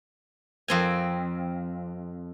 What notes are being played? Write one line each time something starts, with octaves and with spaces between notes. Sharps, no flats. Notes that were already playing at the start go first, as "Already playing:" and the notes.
F2 C4 G#5